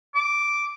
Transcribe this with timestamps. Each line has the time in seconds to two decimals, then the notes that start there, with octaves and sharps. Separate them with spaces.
0.15 D6